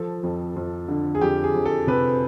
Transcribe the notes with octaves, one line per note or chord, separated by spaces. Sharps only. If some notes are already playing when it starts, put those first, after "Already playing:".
Already playing: F3 A4
F2
F2
D3
G#4
F2 G4
G#4
F2
A4
C3 B4